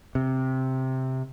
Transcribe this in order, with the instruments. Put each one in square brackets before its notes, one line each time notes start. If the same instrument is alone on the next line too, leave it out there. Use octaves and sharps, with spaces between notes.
[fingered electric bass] C3